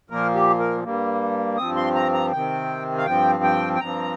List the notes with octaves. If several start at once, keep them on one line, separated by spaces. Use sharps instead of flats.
A#2 F3 A#3 A#4
G4
A#4
G2 G3 A#3
G2 F3 C4 D#6
C6
A#5
A#5
C3 D#3 C4 G5
F5
G2 F3 C4 G5
G5
G5
G2 F3 C4 A#5